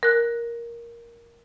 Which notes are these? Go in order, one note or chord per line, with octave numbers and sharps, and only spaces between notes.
A#4 F#6